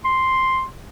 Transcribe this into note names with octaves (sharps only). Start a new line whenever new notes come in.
C6